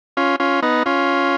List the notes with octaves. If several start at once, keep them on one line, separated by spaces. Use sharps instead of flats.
C#4 F4
C#4 F4
B3 D#4
C#4 F4